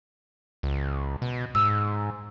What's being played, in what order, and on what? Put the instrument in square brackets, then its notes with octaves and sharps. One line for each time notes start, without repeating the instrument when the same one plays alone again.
[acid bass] C#2
B2
[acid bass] G#2 [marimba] E6